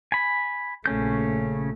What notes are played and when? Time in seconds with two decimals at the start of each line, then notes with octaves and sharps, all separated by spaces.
0.12 G#5 B5
0.86 A#1 C#3 A3 C#4 G6